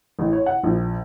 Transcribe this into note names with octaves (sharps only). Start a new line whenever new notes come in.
A1
C#5
F#5
A#1